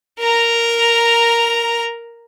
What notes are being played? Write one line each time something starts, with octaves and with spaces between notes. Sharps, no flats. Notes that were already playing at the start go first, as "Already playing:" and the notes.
A#4 A#5